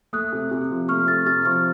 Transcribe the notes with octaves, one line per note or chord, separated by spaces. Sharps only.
A3 D#6 F#6
C3
C3
F3
A3 C#6 F6
C3 F6 A6
C3 F6 A6
F3 C#6 F6